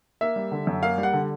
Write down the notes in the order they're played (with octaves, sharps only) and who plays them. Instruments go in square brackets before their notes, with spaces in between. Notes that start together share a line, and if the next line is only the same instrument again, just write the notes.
[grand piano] A#3 E5
G3
D3
F#2
A#3 F5
G3
F#5
D3